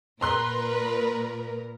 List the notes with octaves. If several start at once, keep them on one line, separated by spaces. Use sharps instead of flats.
A#2 A#4 B4 A#5 C6 F#6